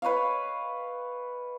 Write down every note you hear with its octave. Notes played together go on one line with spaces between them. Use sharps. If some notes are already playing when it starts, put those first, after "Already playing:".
B4 C#5 D#5 F5